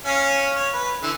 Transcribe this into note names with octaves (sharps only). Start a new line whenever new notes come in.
C#4 F5
C#5
B4
D3 E3